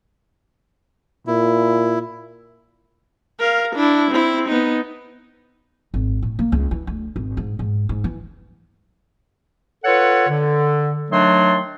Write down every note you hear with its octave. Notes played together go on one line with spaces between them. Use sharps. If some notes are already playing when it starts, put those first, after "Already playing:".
A#2 E4
A#4 F5
D4 E4
C4 E4
B3 D#4
G#1
A2
A#3
C#2
E3
D2
G#1
G#2
G#2
G#2
E3
F4 A4 B4 C#5 F#5
D3
D#3 F#3 A3 D4 C6